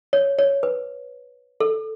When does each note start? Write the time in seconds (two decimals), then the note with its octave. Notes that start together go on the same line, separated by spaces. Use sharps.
0.13 C#5
0.39 C#5
0.63 B4
1.60 A4